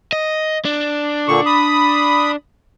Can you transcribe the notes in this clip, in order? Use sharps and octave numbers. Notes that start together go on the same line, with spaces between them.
D#5
D4
A#2 D3 C#6
B5 D#6